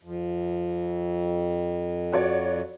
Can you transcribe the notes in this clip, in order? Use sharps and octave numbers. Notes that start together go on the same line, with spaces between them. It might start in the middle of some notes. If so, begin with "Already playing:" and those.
F2
F#4 C#5 D5